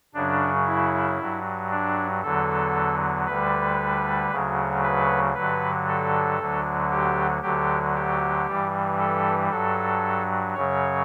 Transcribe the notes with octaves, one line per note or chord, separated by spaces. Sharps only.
F#2 C#3 F#3 D4
E4
G2 F#3
D4
E2 D3 F#3 A4
D2 D3 G3 B4
D2 C#3 F#3
B4
G2 D3 F#3 B4
A4
D2 D3 F#3
G4
D2 D3 F#3 G4
G4
G2 E3 G3
A4
G2 F#3 A4
F#2 C#3 F#3 C#5